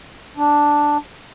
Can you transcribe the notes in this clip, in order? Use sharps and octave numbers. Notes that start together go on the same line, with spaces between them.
D4